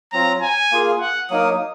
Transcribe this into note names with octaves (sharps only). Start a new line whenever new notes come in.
F#3 C4 F4 A#5
G#5
A#3 F4 G#4
F#5
F#3 A#3 D#4 A#4 D#6